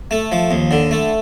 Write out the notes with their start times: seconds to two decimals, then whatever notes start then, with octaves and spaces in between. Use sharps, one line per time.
0.11 A3
0.32 F3
0.51 D#2
0.71 D3
0.91 A3